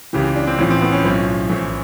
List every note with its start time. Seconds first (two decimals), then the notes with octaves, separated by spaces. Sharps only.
0.13 C#2 C#3 E3 G4
0.36 D4
0.47 C4
0.58 A1 A2 F3 C#4
0.70 C4
0.81 B3
0.93 C#4
1.04 B1 A2 F3
1.50 A#1 A2 E3